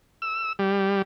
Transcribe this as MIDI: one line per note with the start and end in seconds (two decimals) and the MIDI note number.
0.22 0.53 88
0.59 1.02 55